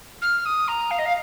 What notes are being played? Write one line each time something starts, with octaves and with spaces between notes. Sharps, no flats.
F6
D#6
A#5
F5
D#5
F5